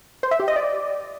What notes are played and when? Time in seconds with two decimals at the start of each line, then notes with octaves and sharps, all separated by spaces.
0.23 C5
0.31 E5
0.40 G4
0.48 D#5
0.56 D5